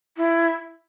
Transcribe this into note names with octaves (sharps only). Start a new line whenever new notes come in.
E4